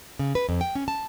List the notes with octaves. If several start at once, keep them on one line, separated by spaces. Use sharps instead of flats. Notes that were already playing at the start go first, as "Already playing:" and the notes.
C#3
B4
F2
G5
C#4
A5